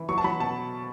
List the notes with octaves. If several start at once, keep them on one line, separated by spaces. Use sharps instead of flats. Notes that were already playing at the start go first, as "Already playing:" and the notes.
Already playing: E3
F#3 C#6
A5
F#3 B5
B2 A5